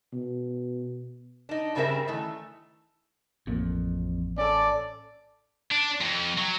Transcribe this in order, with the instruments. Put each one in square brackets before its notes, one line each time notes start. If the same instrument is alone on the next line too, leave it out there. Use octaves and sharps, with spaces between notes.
[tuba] B2
[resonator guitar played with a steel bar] D4 D#4
G2 C#3 G3 C4 A#4 E5
D#3 E3 A3
[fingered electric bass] A1 A#3 [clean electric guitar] F2
[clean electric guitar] C#4 A4 [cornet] D5
[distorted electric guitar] D4
F2
F#3